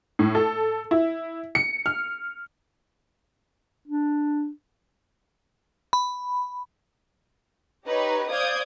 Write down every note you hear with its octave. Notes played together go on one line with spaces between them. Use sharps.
A2
A4
E4
C#7
F6
D4
B5
D#4 G4 B4 C#5
C5 D5 F5 D#6 G6 G#6